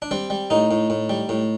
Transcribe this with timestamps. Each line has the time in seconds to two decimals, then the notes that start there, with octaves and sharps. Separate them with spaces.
0.02 D4
0.11 G3 C4
0.30 G3
0.50 A2 D#4
0.71 A2
0.90 A2
1.09 G3
1.29 A2